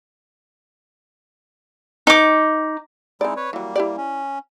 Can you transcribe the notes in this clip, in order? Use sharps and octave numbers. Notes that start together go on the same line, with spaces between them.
D#4 D6
G#3 C4 D#4 E4 D5
B4 C#5
E3 F#3 G3 A#3
E4 G4 D5
C#4